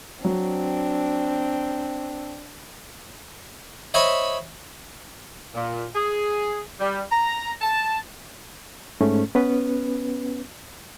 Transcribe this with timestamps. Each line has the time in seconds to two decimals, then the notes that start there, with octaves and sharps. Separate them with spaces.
0.24 F#3 C4 D4
3.94 C5 C#5 D#5 E5 G#5 B5
5.55 A#2
5.95 G#4
6.80 G3
7.12 A#5
7.61 A5
9.01 G#2 A3 C#4
9.35 B3 C#4 B4